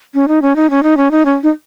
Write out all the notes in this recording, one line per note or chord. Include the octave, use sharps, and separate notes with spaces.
C#4
D#4
C#4
D#4
C#4
D#4
C#4
D#4
C#4
D#4